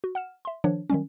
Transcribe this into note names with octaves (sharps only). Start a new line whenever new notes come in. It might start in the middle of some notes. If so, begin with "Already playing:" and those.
F#4
F#5 F6 E7
E5 C6
D#3 F3 D4 C#5
D#3 F#3 G3 C#4